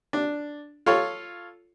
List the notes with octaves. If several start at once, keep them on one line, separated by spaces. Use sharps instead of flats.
D4
F4 A4 C#5